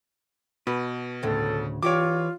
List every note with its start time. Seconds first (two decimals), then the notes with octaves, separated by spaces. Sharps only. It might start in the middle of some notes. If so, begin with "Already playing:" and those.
0.67 B2 B4
1.23 D2 A2 C#3 A4
1.83 E3 F4 G4 C#5 D5 D6